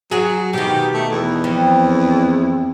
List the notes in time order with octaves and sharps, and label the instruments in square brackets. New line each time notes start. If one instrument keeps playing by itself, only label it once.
[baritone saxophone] F#3 [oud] F#4 G#4
[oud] B2 D#3 [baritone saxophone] G4
[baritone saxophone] A3
E2
[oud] F2